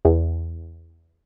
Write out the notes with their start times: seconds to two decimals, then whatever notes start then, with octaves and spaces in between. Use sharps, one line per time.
0.05 E2